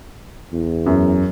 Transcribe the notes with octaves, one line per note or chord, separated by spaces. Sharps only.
E2
F#2